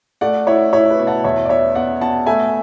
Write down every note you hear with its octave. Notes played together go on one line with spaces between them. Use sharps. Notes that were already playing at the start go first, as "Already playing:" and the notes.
A3 D5 F#5
E4 C#5 E5
E4 C#5 E5
B4
B2
F#5 A5
E2 C#5 E5
D5
B3 C#5 E5
B3 D5 F#5
B3 F#5 A5
A3 E5 G#5